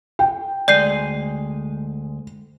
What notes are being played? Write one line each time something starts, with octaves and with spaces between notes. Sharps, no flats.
G5
D2 G#3 D5 G#5 G6 C7